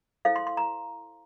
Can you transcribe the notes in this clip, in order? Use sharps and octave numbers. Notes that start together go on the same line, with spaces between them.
E4 A4 C5 F5
C6
C6
A#5